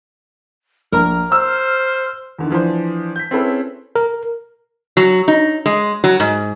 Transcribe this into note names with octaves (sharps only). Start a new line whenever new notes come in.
A#1 A#4 A#5 F6
C5 E6
E2 D3 D#3
E3 F3 D4 C5
G6 B6
C4 C#4 E4 G#4 A4 B4
A#4
F#3
D#4
G#3
F#3
G#2